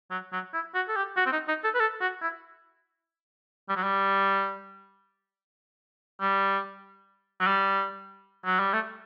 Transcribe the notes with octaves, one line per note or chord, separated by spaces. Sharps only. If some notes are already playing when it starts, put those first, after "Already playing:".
F#3
F#3
E4
F#4
A4
G4
F#4
C4
D#4
D#4
A4
B4
A4
F#4
E4
G3
F#3
G3
G3
F#3
G3
F#3
G3
A3